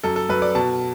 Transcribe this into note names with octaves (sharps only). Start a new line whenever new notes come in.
F#2 A4
A4
F#2 B4
D5
B2 A5